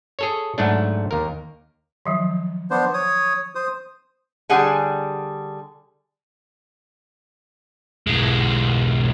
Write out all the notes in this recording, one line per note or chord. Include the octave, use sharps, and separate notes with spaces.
G#4 A4 C#5
G#2 F#3 A3 D4
D#2 A#4
D#3 F3 F#3
B3 D4 C5
C#5 D#6
C5 D#6
D3 G3 G#4 F#5 G#5
B1 G#3